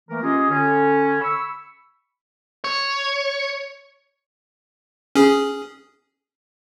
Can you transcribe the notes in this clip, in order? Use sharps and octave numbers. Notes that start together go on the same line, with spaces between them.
E3 A3 A#3 A#4
C#4 F4 G4 G#4 D#5
D3 C#4
B5 C#6 E6
C#5
C#4 G#4